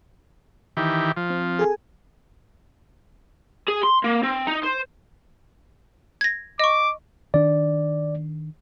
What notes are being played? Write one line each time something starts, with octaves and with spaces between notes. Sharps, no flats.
D#3 E3 G4
F3
C4
G#4 A4 G#5
G#4
C6
A#3
C4
D#4
C5
G#6 A#6
D#5 C#6 D6
D#3 D4 D5